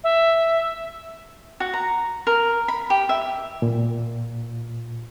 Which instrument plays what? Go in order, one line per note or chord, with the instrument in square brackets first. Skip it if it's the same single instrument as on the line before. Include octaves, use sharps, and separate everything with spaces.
[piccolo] E5
[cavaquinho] F#4
A#5
A#4
B5
G4
E5
[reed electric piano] A#2